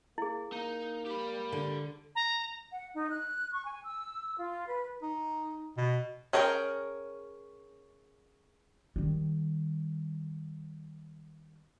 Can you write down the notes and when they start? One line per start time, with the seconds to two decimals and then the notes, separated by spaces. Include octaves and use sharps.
0.18 A#3 E4 G#4
0.52 A#3 D#4
1.07 G4 B5
1.52 D3
2.15 A#5
2.71 F#5
2.94 D#4
3.09 F#6
3.53 C#6
3.65 G#5
3.85 E6
4.37 F4
4.67 B4
5.02 D#4
5.77 B2
6.33 C#4 G#4 A#4 B4 G5
8.96 D#3 G3